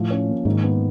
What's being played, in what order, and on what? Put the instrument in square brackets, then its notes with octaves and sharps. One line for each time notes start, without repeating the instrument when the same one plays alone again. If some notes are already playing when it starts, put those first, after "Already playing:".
Already playing: [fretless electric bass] A2 [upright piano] F3
[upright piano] C#4
A#3
[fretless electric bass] G#2 [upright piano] D#3
[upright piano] B3